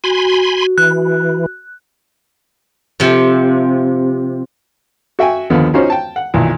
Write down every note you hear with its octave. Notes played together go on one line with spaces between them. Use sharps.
F#4 G#5 B5 C6
E3 F#6
C3 F3
F#4 E5 G5 G#5
D#2 D3 F3 B3
C#4 D#4 F4 F#4 C5 C#5
G5 A5
F#5
B1 A#2 D#3 E3